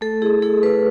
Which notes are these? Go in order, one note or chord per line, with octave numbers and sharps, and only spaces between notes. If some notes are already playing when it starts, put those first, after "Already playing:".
A3 A4
E4 G#4
E4 A4
A3 B4